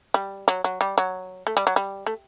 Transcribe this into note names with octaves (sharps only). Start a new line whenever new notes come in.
G3
F#3
F#3
G3
F#3
A3
G3
F#3
G3
A3